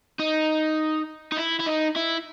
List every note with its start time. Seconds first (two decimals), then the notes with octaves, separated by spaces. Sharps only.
0.19 D#4
1.32 D#4
1.37 E4
1.59 E4
1.66 D#4
1.96 E4